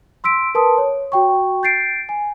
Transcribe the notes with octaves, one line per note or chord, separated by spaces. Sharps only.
C6 E6 B6 D7
A#4 B4 A5 C6 D#6
C#5
F#4 G5 C#6
G6 A6 C7 D7
G#5